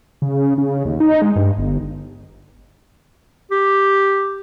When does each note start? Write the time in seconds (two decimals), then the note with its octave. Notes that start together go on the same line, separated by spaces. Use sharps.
0.22 C#3
0.58 C#3
0.85 D#2
1.00 D#4
1.22 G#3
1.36 G2
1.58 G1
3.51 G4